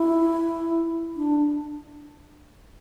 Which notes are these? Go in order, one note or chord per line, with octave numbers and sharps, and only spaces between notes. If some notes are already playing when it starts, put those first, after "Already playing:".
Already playing: E4
D4